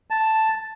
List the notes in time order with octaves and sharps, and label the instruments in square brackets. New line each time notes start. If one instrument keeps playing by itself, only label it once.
[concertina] A5